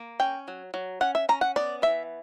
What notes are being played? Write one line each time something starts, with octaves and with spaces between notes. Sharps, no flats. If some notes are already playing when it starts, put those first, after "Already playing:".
Already playing: A#3
C#4 G5
F#3
F#3
C#4 F#5
E5
C#4 A#5
F#5
B3 D5
E3 E5